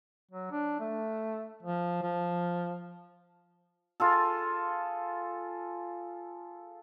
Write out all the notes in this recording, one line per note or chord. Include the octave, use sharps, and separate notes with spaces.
F#3
D4
A3
F3
F3
F4 G#4 A4